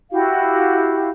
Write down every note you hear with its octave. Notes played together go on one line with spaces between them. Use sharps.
E4 F#4 G4 F5